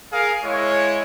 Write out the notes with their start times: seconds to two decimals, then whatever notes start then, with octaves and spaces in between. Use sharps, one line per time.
0.13 G#4 A#4 F5
0.44 G#3 E4 C#5